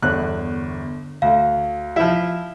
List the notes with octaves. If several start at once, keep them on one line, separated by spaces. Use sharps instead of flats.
G1 E2 D3 F#6
D2 F5
F3 E4